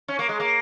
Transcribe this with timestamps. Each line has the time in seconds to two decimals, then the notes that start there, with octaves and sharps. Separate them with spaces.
0.08 C#4
0.19 A#3
0.29 G#3
0.40 A#3